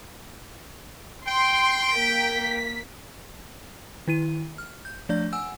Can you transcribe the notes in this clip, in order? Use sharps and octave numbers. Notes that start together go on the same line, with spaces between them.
G5 C6
A#3 B6
D#3 E4 D#7
F6
G6
F3 A3 D4 D5 G6
F#5 G#5 E6